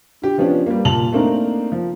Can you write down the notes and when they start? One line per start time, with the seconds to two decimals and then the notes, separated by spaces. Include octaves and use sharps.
0.22 D3 G4
0.38 F3 B3 C#4 D4 F4
0.66 G3 A#3
0.85 A#2 A5 F7 F#7
1.13 A3 A#3 C4 D4 D#4 A#4
1.72 F3